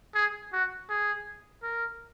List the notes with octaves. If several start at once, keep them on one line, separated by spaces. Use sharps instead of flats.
G#4
F#4
G#4
A#4